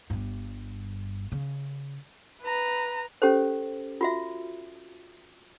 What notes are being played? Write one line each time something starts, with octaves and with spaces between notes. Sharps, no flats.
G1 G2
C#3
B4 A#5
C#4 G4 A4 C5
F4 F#4 E5